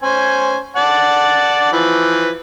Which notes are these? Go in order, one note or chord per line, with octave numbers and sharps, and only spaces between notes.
C#4 C5 G#5
D5 F#5 A5
E3 F3 B4